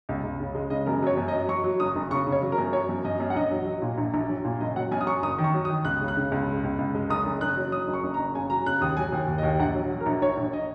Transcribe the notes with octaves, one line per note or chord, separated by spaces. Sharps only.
C#2
C#2
C#3
G#3
C#3 D#5
F#2 A#4
F#3 C#5
F#2
D#5
F#3
F#3 C#6
F#3
F#1 D#6
F#1
C#3 C#6
C#3
C#5
F#3
A#4
F#2
F#3 C#5
F#2
F#2 D#5
F#2
F#5
A#1 D#5
F#3
F#3
A#2
A#1
A#1
F#3
A#2
F#1 D#5
F#3 F#5
F#2 G#5
D#6
F#3 C#6
F#1 D#6
D#3
C#6
F#3
D#6
D#3
C#2 F#6
C#3
F#6
C#3
C#2
G#3
C#2
C#2
G#3
F#1 D#6
F#1
F#1 F#6
F#3
F#3 D#6
F#1
C#6
F#1
A#5
F#1
C#3 G#5
F#3 A#5
C#3 F#6
D#2 D#6
F#3 G#5
D#2
D#2
D#5
D#2
A#1 F#5
F#3
F#3
A#4
A#1
A#1 C#5
A#1
D#5